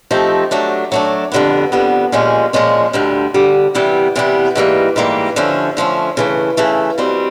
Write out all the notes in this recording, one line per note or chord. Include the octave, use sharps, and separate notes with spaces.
F3 A3 C4 D#4 G4
F#3 A3 D4
F#3 A3 D4
F2 D3 G3 B3
F2 D3 G3 B3
A#2 F3 G#3 C#4
A#2 F3 G#3 C#4
D2 D3 G3
D2 D3 G3
C3 E3 G3 B3
C3 E3 G3 B3
G#2 E3 G3 A#3
G#2 E3 G3 A#3
D3 F3 A3 C#4
D3 F3 A3 C#4
C#3 E3 A3
C#3 E3 A3
B2 G3 C4